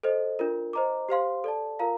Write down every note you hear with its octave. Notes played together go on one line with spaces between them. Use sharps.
A4 C5 D#5
D4 F4 A#4
C5 D#5 A#5 D6
G4 C5 F5 C6
A4 D5 A5
F4 A#4 F5 A#5